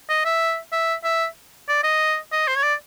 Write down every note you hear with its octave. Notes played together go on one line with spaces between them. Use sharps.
D#5
E5
E5
E5
D5
D#5
D#5
C5
C#5
D5